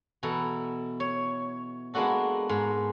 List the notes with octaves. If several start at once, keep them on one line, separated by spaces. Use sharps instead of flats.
B2 E3 E4 A4 A#5
C#5
G#3 A#3 B3 D4 F#4 A4
G#2